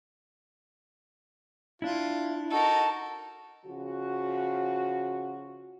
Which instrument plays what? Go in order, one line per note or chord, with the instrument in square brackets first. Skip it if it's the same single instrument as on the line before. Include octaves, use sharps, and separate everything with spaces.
[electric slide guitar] D4 E4 [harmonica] F4
[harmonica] D#4 F#4 [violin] A4 A#4
[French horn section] C#3 F3 F#4